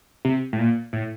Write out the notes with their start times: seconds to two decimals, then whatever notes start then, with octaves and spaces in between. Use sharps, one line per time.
0.25 C3
0.53 A2
0.59 A#2
0.93 A2